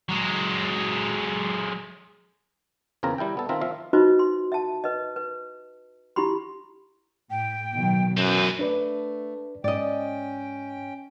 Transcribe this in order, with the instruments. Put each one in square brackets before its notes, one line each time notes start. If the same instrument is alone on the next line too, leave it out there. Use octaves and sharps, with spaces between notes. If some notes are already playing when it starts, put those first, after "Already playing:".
[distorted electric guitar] F#3 G#3
[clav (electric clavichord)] E2 C#3 C4 F4 A#4 A#5
G3 E4 A4 G5
B3 A4
D#3 C4 F4 E5 A#5
F3 E5 F5
[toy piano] D#4 F4 F#4 B4 C5 D#5
C6
E5 A5
B4 D#5
B4
E4 F4 G4 B5 C6
[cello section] A2 [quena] G5
[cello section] B2 D#3 F#3
[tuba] F#2 [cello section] E3 C#4 [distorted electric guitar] C4 B4
[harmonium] A3 [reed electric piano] D4 B4 D5
[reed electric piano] G#2 [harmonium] C#4 G5 [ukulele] D5 D#5